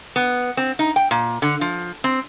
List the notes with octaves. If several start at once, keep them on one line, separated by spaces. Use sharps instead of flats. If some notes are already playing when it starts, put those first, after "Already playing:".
B3
C4
D#4
G5
A#2
D3
F3
C4